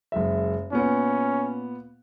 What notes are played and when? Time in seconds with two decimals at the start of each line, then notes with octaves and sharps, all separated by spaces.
0.12 F#1 G#3 E5
0.72 A#2 B3 C#4